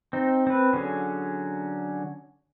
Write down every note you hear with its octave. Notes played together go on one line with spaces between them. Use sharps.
C4 D#4
C4 B4
D3 F#3 C#4 G#4